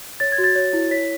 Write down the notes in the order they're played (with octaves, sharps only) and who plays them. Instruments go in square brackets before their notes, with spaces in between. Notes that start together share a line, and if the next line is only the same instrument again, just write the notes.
[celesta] C#5 A6
G#6
F#4
A6
C#5
E4
C#5 B6